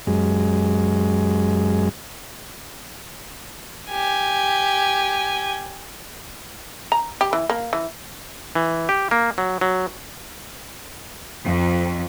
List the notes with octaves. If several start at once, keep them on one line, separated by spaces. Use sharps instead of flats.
F#2 G#3
G4 G#5
A#5
G4
E3
A#3
E3
E3
G4
A#3
F#3
F#3
F2